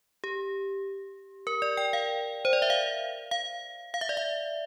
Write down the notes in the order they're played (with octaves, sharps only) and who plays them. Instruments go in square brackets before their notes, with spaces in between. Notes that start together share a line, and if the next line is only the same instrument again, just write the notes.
[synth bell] G4
A#4
D5
G5
F5
C5
D5
E5
F5
F5
F5
E5
D5
E5